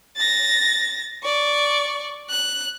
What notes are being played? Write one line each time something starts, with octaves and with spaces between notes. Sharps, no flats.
A6 A#6
D5 C#6
F#6